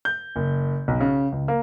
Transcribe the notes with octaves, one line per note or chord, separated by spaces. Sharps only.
G6
F#1
B1
C#3
C#2
A#3